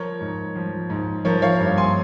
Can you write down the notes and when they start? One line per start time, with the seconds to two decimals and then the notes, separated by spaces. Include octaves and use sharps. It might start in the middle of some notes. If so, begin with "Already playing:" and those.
Already playing: F3 A#4 C#5
0.21 G#2
0.55 F3
0.90 G#2
1.25 F3 A#4 C#5
1.42 C#5 F5
1.60 G2
1.78 G#5 C6